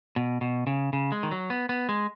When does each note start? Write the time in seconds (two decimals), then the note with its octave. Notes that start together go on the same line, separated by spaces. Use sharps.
0.16 B2
0.41 B2
0.67 C#3
0.93 C#3
1.12 G#3
1.23 D#3
1.31 F#3
1.50 B3
1.69 B3
1.89 G#3